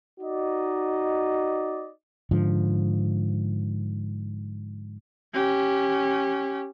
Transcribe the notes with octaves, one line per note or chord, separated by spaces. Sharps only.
D#4 F#4 D5 D#5
G#2 D3 F3
C#4 G4